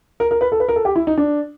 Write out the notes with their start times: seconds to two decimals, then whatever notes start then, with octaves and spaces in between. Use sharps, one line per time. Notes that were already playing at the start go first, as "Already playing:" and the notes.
0.20 A#4
0.31 A#4
0.41 B4
0.52 A4
0.60 B4
0.68 A#4
0.76 A4
0.85 G4
0.96 E4
1.07 D#4
1.18 D4